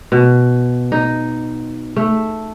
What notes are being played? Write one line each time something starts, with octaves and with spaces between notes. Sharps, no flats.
B2
D#4
A3